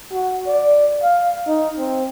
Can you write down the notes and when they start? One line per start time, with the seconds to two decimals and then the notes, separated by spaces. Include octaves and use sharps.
0.12 F#4
0.46 D5
1.02 F5
1.47 D#4
1.78 C4